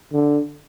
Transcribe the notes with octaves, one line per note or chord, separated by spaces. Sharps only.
D3